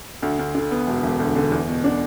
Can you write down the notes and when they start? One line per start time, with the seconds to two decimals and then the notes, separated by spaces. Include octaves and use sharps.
0.22 D2
0.39 D2
0.55 D3
0.71 B3
0.87 E1
1.03 E1
1.20 D2
1.36 D3
1.52 E2
1.68 B2
1.84 D4